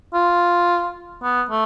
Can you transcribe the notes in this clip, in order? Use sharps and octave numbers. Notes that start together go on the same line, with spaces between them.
F4
B3
A3